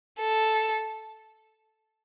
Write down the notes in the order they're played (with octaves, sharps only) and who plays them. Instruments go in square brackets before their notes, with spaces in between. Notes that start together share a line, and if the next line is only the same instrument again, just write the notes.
[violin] A4